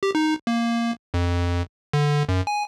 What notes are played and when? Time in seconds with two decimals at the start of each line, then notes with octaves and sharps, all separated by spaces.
0.03 G4
0.15 D#4
0.47 A#3
1.14 F2
1.93 D3
2.29 F#2
2.47 G#5